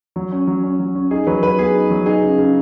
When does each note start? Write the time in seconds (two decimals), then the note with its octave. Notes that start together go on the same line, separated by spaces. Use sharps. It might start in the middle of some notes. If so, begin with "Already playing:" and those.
0.16 F#3
0.32 C#4
0.47 F#3
0.63 C#4
0.79 F#3
0.95 C#4
1.11 D#4 G#4
1.27 F#3 B4
1.43 F#3 B4
1.59 B3 G#4
1.75 D#4
1.90 F#3
2.06 D#4 G#4
2.22 C#3
2.38 C#3